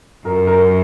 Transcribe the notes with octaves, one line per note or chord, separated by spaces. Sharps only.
F#2 A#4
A#4